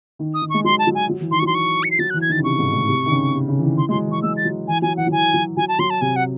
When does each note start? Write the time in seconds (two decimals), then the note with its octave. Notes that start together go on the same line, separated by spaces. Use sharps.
0.19 D#3
0.34 D#6
0.42 D#3
0.50 G#3 C#6
0.64 F#3 C6
0.79 A5
0.87 F#3
0.95 G#5
1.09 F#3
1.21 E3
1.31 D#3 C6
1.40 C#6
1.42 F#3 C6
1.55 C#6
1.84 C#7
1.91 C7
1.99 F#3 A6
2.10 F#6
2.14 E3
2.22 G#6
2.29 D#3 A6
2.38 C#3
2.44 C3 C#6
2.59 G#2
2.73 A2
2.88 C3
3.06 D#3
3.11 C#3
3.34 C3
3.48 C#3
3.59 E3
3.63 D#3
3.78 E3 C6
3.89 G#3 C6
3.92 F#3
4.07 E3 C#6
4.22 G#3 E6
4.37 A6
4.45 F#3
4.68 E3 G#5
4.82 F#3 G#5
4.97 E3 F#5
5.07 F#3
5.12 E3 G#5
5.34 F#3
5.57 F#3 G#5
5.68 A5
5.79 F#3 C6
5.90 A5
6.01 C3 G#5
6.16 F#5